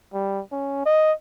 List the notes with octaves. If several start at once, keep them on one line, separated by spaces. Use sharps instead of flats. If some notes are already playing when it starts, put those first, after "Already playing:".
G3
C#4
D#5